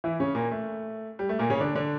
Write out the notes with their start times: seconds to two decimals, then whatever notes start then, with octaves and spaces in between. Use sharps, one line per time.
0.04 E3 E4
0.20 C#3 C#4
0.35 A#2 A#3
0.51 A3
1.19 G3
1.29 A3
1.39 A#2 A#3
1.50 C#3 C#4
1.60 D3 D4
1.75 D3 D4